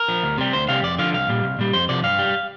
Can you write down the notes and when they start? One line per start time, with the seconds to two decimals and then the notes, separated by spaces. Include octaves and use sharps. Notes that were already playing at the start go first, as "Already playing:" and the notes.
Already playing: A#4
0.08 F3
0.23 D2
0.38 C3 G3
0.53 D2 C5
0.69 C3 G3 F5
0.83 F2 D5
0.98 D3 F3 F5
1.13 C2 F5
1.29 A#2 G3
1.44 C2
1.59 A#2 G3
1.73 F2 C5
1.89 C3 F3 D5
2.04 G2 F5
2.19 G3